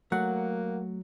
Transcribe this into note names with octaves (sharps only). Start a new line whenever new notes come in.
F#3 A3 A#3 F#5